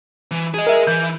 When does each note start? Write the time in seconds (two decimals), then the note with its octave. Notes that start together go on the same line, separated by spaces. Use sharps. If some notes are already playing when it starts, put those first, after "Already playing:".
0.31 E3
0.54 G#4 D#5
0.67 A#4 E5
0.87 E3 G6